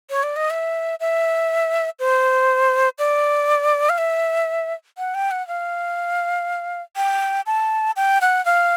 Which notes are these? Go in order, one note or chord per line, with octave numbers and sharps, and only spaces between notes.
C#5
D5
D#5
E5
E5
C5
D5
F5
E5
F#5
G5
F#5
F5
G5
A5
G5
F#5
F5